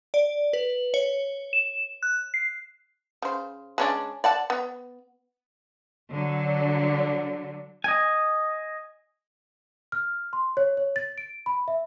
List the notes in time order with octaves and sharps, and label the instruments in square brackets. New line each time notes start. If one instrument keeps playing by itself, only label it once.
[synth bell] D5
B4
C#5
E7
F#6
C7
[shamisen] C#3 C5
G#3 C#4 D4
D5 F#5 A5
B3
[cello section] D3 F#3
[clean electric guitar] D#5 G#5
[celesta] F6
C6
C#5
C#5
A6
D7
B5
E5